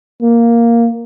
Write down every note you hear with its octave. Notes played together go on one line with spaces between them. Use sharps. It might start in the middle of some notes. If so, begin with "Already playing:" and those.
A#3